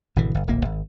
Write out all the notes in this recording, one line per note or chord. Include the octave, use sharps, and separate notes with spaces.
G#1 B2 D3 E3
G1
D1 A#1 A#2 A#3
G#1